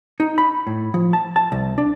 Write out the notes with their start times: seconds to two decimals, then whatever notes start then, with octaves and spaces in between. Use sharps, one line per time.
0.20 D#4
0.38 B5
0.67 A2
0.94 F3
1.13 A5
1.36 A5
1.52 C2
1.78 D4